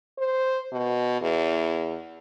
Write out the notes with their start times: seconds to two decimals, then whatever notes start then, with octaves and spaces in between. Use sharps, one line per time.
0.19 C5
0.72 B2
1.21 E2